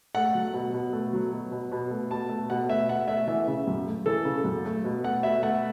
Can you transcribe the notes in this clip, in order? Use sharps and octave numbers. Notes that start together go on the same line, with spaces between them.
A3 F#5
F#3
B2
B2
A3
F#3
B2
B2
B2
A3
B2 A5
A3
B2 F#5
A3 E5
B2 F#5
A3 E5
E3 E5
C#3
F#2
A3
E3 A4
C#3
F#2
A3
B2
A3 F#5
B2 E5
A3 F#5